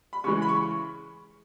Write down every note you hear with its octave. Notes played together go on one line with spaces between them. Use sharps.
B5
C#3 E3 G#3 C#6
B5
C#6